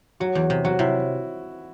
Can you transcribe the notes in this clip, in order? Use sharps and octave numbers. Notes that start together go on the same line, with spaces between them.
F#3 F#4
E2
C3
F#3 F#4
C3 E4